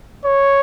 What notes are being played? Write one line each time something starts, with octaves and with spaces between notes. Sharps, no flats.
C#5